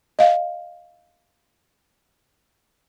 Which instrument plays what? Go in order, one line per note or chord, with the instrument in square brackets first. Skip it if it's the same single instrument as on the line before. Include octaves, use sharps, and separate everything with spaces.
[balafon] D#5 F5